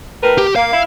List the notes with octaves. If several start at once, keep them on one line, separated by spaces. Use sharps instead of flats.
A2 A#4 B4
G4
A#3 F5
E4